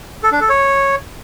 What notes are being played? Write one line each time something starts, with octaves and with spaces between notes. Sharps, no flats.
A4
D4
A4
C#5